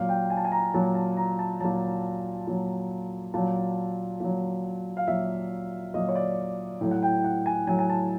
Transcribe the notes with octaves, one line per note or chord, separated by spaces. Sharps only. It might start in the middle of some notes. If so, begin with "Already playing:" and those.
Already playing: A#2 F#3 F5
G5
G#5
A5
G#5
A#5
A#2 F#3 A5
A5
A#5
A5
A#2 F#3 A5
A#2 F#3
A#2 F#3 A5
A#2 F#3
F5
A#2 F#3 E5
A#2 F#3 D#5
C#5
D5
A2 F#3
F#5
G5
F#5
G#5
A2 F#3 G#5
G#5
A5